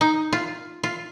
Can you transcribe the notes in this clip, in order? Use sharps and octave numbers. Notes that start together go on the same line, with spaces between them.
D#4
F4
F4